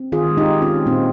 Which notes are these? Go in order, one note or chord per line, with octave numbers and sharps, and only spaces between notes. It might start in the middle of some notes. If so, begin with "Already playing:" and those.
Already playing: C4
D#3 F4 G#4
G#3
D#4 G4
D#3
C#4 F4
C4
A#2 C4 D#4